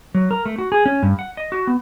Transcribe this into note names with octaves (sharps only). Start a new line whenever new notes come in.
F#3
A#4
A3
F#4
G#4
C#4
G2
F#5
D#5
F#4
B3